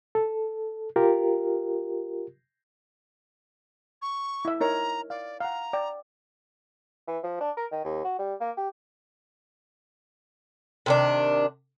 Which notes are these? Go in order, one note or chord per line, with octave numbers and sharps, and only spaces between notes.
A4
F4 G4 A#4
C#6
E4 E5
D#4 A#4 C#5 A#5
D5 F5
F5 F#5 A#5
D5 G5
E3
F3
D4
A#4
D#3
D#2
F#4
G3
A#3
G4
C3 D#3 D4